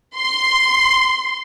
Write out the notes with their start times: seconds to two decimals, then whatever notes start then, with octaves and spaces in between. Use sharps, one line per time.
0.16 C6